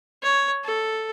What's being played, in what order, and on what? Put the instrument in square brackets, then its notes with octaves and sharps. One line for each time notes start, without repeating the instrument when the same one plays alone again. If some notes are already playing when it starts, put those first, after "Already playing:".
[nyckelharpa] C#5
A4